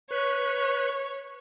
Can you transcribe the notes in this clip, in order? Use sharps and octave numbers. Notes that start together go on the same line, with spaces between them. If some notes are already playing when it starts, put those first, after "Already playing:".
B4 C#5